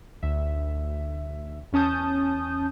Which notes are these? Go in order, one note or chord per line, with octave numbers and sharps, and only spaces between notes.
D2 E5
E2 C#4 A5 D#6 G6